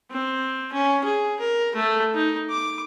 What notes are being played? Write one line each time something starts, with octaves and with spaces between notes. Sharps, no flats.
C4
C#4
G#4
A#4
A3
D#4
D6